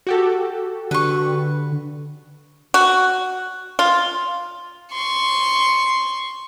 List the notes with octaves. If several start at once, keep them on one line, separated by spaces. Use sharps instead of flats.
F#4 G4 A4
D3 B4 C#6
F#4
F4
C6 C#6